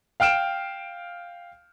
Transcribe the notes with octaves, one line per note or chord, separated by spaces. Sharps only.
F5 G5 F6 D7 E7